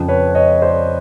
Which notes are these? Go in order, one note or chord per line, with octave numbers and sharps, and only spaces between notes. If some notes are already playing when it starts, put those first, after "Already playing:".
Already playing: F2 C#3 F3
B4 C#5
C#5 D#5
C5 D5